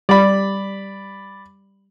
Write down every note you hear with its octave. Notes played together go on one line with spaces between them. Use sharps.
G3 D5 B5